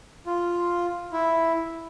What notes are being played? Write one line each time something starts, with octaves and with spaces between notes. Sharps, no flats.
F4
E4